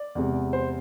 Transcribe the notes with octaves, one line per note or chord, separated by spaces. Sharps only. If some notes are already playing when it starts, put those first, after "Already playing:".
Already playing: D5
E2 C3 G#3
C5